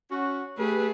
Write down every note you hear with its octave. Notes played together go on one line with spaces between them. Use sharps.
C#4 F#4
A3 G4 G#4 B4